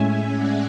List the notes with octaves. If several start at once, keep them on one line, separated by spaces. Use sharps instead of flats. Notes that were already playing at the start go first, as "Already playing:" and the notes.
Already playing: A2 G#3 C#4 E5 G#5
D5 F#5